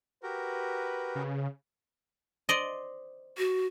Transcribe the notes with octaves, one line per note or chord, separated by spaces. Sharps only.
F#4 G4 A#4 B4
C#3
C5 D5 D#5
F#4